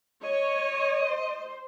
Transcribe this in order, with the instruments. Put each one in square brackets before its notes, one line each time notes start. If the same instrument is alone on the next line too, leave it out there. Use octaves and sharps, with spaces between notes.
[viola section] C#5 [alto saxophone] D#5
[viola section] C5